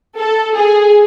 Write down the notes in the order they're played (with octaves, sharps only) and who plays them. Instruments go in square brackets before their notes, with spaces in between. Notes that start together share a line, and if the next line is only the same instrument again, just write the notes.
[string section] A4
G#4